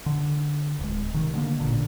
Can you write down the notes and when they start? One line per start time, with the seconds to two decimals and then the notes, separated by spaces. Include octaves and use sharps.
0.06 D3
0.79 D1 G#3
1.14 C3 D#3
1.34 D3 G3 A#3
1.60 A1 A#2 D3